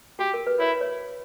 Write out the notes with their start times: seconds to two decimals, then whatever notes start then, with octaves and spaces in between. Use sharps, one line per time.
0.19 F#4 G4
0.34 A#4
0.47 B4
0.60 E4 C#5
0.81 C#5